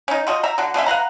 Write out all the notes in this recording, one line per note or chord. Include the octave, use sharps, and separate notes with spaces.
C#4 D#4
F4 F#4 G#4 D#5
E5 A#5
D3 F#4
B2 D3 C#4 E5
B4 F5 F#5 A#5